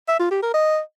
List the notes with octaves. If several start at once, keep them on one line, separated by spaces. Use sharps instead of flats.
E5
F4
G4
A#4
D#5